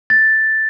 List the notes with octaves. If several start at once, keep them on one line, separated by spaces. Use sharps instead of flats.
A6